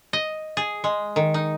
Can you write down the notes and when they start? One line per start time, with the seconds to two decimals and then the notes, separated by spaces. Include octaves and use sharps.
0.13 D#5
0.57 G#4
0.84 G#3
1.16 D#3
1.34 D#4